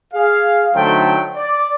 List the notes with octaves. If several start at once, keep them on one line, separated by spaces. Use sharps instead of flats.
G#4 F5
D3 F#3 A3 D#4 C5 G5
D5